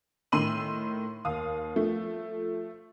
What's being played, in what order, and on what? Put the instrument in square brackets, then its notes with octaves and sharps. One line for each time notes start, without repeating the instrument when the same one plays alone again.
[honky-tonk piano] A2 D#3 C6 E6 D#7 F#7
D#2 F5 D#6
F3 A3